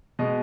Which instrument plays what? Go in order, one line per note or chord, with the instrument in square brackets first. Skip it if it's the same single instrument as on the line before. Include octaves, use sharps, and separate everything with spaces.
[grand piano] B2 G#3 D#5